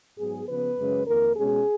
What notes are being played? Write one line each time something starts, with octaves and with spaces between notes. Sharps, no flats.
G#2 F#3 B3 G#4
C#3 F3 B3 B4
F#2 C#3 G#3 C#4
F2 D#3 A#3 A#4
B2 G#3 C#4 G#4